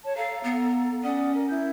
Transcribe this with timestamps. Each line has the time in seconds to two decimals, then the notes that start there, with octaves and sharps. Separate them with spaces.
0.04 C#5 A5
0.16 A4 F5 A#5
0.44 B3
1.04 C#4 D5 F#5 D#6
1.35 A#4
1.49 E4 G6